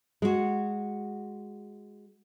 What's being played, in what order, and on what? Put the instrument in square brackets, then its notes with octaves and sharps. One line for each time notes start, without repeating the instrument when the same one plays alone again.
[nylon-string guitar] G#3 F#4